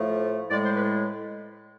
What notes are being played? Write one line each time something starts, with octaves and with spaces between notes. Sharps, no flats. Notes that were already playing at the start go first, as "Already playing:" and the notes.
Already playing: A2 F3 A3
A2 G#3 D5
C5
B4